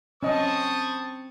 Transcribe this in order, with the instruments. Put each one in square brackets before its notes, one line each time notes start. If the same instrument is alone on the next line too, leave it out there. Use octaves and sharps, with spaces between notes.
[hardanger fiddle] C4 A5 [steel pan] C#4 D#5 [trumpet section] B5 C#6 D#6